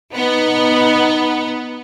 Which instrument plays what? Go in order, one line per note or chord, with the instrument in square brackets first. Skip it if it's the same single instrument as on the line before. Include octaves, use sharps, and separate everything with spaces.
[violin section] B3 [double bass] D#4